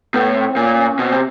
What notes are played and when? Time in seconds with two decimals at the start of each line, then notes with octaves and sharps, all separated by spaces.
0.14 A2 B3
0.36 C4
0.56 A#2 C#4
0.78 C#4
0.99 B2 C4
1.12 C3